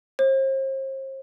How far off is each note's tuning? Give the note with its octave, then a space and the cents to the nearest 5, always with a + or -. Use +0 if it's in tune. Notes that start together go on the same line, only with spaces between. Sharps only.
C5 +40